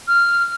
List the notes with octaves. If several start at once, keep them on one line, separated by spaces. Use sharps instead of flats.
F6